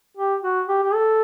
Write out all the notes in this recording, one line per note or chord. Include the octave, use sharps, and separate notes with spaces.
G4
F#4
G4
G4
A4